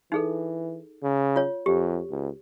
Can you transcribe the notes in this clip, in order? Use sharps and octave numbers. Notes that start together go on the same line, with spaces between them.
E3 D#4 G#4 A4
C#3
F4 C#5
F2 G4
C#2